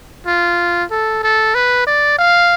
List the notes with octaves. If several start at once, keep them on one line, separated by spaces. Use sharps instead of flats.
F4
A4
A4
B4
D5
F5